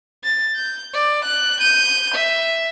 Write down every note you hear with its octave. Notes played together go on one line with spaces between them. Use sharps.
A6
G6
D5
F#6
G6 D#7
E5